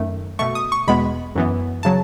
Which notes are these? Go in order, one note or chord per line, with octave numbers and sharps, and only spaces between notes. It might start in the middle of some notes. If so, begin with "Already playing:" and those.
Already playing: F#2 D#3 A3
B2 A3 C#6
D#6
C#6
E2 B2 G#3 B3 B5
F#2 E3 B3
C#3 F#3 A5